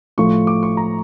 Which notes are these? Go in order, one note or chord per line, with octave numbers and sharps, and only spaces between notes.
A2 F3 A3 C#6
D6
C#6
A#5